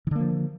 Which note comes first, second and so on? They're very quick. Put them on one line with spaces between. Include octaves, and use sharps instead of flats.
D#3 D3 A#3 F3